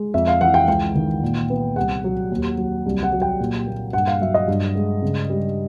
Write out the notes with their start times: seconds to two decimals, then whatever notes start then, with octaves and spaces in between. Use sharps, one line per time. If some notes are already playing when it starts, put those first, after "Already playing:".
Already playing: G#3
0.14 F2 E5
0.27 F5
0.41 E3 F#5
0.54 G5
0.67 C#2 G5
0.95 D#3
1.22 A#2
1.50 B3
1.76 C2 F#5
2.04 F#3
2.31 D#2
2.58 F#3
2.86 C2
3.03 F#5
3.12 F#3
3.22 G5
3.40 A#2
3.67 A#3
3.93 G2 F#5
4.08 F5
4.21 F#3 E5
4.34 D#5
4.48 G2
4.75 G#3
5.02 C#3
5.30 G3